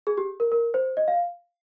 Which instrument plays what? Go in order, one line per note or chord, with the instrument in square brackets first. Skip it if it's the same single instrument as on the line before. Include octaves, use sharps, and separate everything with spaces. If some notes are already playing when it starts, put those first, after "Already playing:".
[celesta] G#4
G4
A#4
A#4
C5
D#5
F5